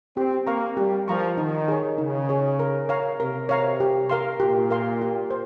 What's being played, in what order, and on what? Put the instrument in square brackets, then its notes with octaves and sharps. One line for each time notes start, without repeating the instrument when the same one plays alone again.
[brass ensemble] C4 [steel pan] G4
[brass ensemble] A#3 [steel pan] A#4 F5 A#5 C#6
[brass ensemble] G3 [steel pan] G4
[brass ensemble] F3 [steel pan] A#4 F5 A#5 C#6
[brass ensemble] D#3 [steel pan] D#4
[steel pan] G#4 C#5
[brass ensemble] C#3 [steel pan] D#4
[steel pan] G#4 C#5
A#4
C#5 F5 A#5
[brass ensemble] C3 [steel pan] A#4
[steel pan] C#5 F5 A#5
G4
A#4 F5 C6
[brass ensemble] A#2 [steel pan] G4
[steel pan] A#4 F5 C6
G4
C5